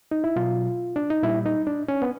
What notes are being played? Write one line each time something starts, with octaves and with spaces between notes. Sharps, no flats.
D#4
E4
B2 F#3 F4
D4
D#4
A#2 G3 E4
D#4
D4
C#4
B3